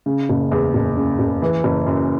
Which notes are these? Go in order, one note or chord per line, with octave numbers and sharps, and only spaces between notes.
C#3
F#1
E2
F#1
C#3
F#1
E3
F#1
F#2